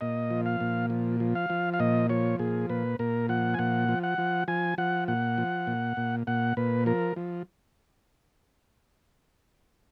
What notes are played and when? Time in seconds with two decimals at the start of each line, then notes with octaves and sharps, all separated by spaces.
0.01 A#2 D#5
0.31 F3
0.46 F5
0.60 A#2
0.90 F3
1.20 F3
1.35 F5
1.50 F3
1.74 F5
1.80 A#2 D#5
2.09 F3 C#5
2.39 A#2 G#4
2.69 A#2 B4
2.99 A#2 A#4
3.29 F3 F#5
3.54 G#5
3.59 A#2 F#5
3.89 F3
4.03 F#5
4.18 F3
4.48 F3 G#5
4.78 F3 F#5
5.08 A#2 F#5
5.38 F3
5.67 A#2
5.97 A#2
6.27 A#2 F#5
6.57 A#2 B4
6.86 F3 A#4
7.16 F3